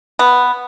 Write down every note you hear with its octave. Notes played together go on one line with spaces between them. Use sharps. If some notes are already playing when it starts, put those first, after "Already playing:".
B3